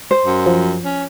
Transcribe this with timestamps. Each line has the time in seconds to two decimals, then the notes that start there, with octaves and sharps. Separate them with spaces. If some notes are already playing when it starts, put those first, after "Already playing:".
0.11 C5
0.26 F#2
0.46 F3
0.85 C#4